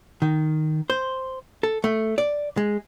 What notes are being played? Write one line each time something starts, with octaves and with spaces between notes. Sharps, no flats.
D#3
C5
A4
A3
D5
G#3